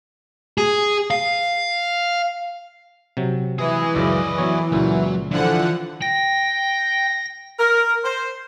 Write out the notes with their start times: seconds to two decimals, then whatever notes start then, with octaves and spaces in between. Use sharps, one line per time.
0.58 G#4
1.11 F5
3.17 C3 F#3
3.59 E3 G#4 D#5
3.95 C#2 F#2 C#3 D5 D#5
4.38 F#3 B3 C#5
4.72 C#2 A#2 F#3
5.31 D3 E3 F3 F#5
6.02 G5 A#6
7.59 A#4
8.05 C5